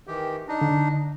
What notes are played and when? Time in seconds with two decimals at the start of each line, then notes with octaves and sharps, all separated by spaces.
0.07 D#3 E3 G4
0.48 D4 D#4
0.61 D3